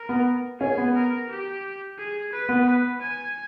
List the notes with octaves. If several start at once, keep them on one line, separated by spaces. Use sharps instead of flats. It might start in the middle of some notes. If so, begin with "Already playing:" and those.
Already playing: A#4
B3
C#4 G#4
B3
A#4
G4
G#4
B4
B3
B4
G#5